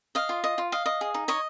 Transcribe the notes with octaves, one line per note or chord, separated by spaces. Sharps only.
D#5 F5
F4
D#5
F4
D#5 F5
D#5
G#4
D#4
C#5 D#5